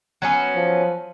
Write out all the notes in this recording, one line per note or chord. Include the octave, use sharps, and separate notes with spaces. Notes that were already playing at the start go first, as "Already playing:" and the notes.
F#3 B3 C#4
F3